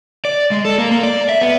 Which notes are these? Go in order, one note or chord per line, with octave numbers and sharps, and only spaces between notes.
D5
G#3
A4
A#3
A#3
D5
E5
B3